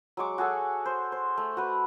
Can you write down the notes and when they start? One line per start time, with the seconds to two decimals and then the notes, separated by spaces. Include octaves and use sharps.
0.17 F#3 G#3 C#6 D6
0.38 F#4 G#4 A4 F#5
0.86 C5
1.12 C5
1.38 A3
1.57 F#4 B4